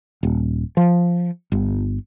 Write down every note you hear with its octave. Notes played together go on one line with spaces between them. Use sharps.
D#1
F3
G1